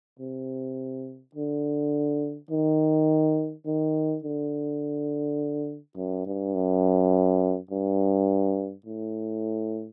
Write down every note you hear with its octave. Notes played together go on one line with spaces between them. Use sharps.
C3
D3
D#3
D#3
D3
F#2
G2
F#2
G2
A2